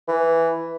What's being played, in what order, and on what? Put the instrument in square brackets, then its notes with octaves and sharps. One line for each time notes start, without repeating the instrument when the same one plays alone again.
[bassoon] E3